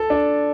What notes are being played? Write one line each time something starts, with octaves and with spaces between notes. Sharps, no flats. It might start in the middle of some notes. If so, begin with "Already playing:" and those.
Already playing: A4
D4